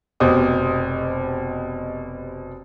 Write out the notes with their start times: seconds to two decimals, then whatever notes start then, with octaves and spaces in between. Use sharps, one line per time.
0.20 F1 B2 G4 C5 D#6